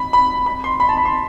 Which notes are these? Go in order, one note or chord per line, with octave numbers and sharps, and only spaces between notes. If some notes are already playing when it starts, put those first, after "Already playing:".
Already playing: B5
B5
B5
C6
B5
A5
B5
C6